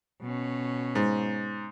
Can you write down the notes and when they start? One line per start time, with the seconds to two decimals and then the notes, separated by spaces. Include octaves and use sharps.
0.22 B2 C#4
0.95 G#2